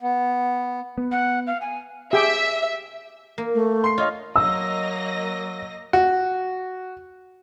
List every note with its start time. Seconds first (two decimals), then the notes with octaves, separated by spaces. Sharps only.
0.01 B3
0.98 B3
1.12 F#5
1.47 F5
1.61 G#5
2.13 G4 G#4 E5 G5
3.38 A#3
3.54 A3
3.84 C6 C7
3.98 F4 C#5 D#5 F5
4.36 F#3 A#3 D#5 E6 A#6
5.93 F#4